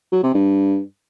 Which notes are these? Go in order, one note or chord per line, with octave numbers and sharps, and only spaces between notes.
F#3
C3
G2